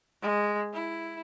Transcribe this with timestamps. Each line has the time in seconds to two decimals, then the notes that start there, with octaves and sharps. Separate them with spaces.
0.22 G#3
0.73 E4